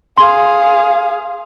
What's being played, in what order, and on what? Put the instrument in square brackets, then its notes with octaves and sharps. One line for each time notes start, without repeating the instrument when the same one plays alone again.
[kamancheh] G#4 F5 [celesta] C6